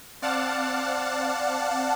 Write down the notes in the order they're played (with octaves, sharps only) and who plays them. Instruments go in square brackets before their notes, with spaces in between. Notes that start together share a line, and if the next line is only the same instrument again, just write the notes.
[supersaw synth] C4 D5 F5 F#5 A5